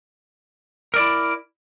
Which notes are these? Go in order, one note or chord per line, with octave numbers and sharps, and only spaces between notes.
E4 A#4 D5